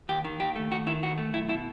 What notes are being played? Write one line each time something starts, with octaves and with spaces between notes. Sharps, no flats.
D#2 G4
D#3
D#2 G4
A3
D#2 F#4
D#3 E4
D#2 F#4
A3
B1 E4
B2 E4